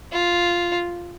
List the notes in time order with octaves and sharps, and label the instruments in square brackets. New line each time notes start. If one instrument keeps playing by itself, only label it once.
[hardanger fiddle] F4